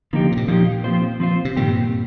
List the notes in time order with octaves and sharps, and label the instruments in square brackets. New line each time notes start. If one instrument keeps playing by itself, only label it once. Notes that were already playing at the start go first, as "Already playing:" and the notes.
[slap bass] D3 [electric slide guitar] F3 A#3 D#4 G4
[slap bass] D3
C3
A#2
[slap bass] A#2 [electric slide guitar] F3 A#3 D#4 G4
[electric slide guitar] F3 C4 F4 C5
F3 C4 F4 C5
[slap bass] C3
[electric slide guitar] G2 D#3 G3 C4 G4 [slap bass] A#2